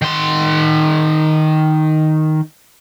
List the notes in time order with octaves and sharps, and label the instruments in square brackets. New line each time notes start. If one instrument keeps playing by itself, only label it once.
[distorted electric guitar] D#3 C6